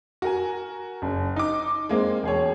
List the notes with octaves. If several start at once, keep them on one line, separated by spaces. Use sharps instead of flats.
F#4 A#4 G#5
F#1
D#4 D6
G#3 A#3 C4
E1 G#4 C#5